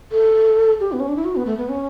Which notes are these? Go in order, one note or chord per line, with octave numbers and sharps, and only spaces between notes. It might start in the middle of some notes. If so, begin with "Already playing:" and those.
A4
G4
B3
C#4
D4
E4
F#4
B3
A3
B3
C#4